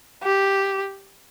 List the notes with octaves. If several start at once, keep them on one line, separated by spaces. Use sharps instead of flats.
G4